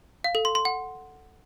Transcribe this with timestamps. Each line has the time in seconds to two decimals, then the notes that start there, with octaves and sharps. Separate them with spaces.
0.24 F5
0.35 A4
0.45 C6
0.55 C6
0.65 F#5